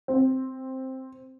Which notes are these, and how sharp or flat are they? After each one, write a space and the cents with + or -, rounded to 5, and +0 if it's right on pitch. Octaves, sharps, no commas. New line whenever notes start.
C4 +0